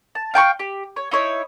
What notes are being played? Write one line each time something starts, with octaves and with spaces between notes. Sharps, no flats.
A5
F5 G5 A5 C#6
G4
C#5
D#4 E4 C#5